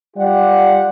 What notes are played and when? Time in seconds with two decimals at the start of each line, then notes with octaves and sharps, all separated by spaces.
0.17 G3 F4 G4 D5 F#5